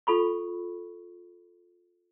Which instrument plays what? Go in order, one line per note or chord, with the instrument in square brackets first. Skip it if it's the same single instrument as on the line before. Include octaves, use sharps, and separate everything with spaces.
[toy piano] F4 A4 B5 C#6